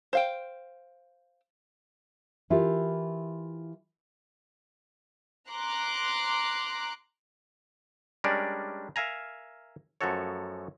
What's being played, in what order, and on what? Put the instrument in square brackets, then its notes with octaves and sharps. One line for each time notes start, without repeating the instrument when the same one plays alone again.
[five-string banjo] C5 F5 G5
[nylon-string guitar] E3 E4 F4 G4 A#4
[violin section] A#5 C6 D6 F#6
[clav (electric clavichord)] G3 G#3 C#4 D4 A#4 D5
A#4 E5 F5 G#5 A#5
F#2 F3 A3 F#4 A4 C#5